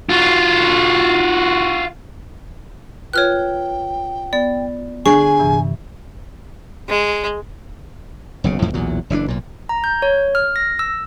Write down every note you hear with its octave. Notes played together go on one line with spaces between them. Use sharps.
F4 F#4
F4 B4 C#5 G5 F6 F#6
B3 D5
D3 D4 G#4 G#5 C#6
G2 C3 E3
G#3
F#1 B1 C#3
F2 A2 E3 F3
B1 E2 A#2 F#3
F#1 E3 C4 D4
B1 A#2
A#5
G6
C#5
F6
A#6
E6